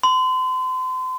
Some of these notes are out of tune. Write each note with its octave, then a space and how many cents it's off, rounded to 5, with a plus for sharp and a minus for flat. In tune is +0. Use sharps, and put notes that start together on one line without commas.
C6 -35